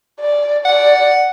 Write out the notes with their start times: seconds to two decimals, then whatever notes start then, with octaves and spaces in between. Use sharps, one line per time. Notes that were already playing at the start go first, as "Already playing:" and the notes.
0.21 D5
0.65 D5 F#5